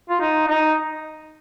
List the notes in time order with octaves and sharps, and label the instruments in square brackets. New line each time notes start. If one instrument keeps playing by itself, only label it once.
[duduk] F4
D#4
D#4